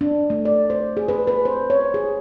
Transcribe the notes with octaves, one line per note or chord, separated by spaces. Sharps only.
D4
A3
D5
C5
G#4
B4
B4
C5
C#5
G#4